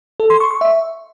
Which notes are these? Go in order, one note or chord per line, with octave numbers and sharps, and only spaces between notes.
A4
C6
C#6
C#6
E5